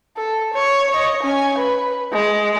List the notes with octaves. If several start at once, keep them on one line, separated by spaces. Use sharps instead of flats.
A4
C#5
C#5 D#5
C#4 G#5
B4
G#3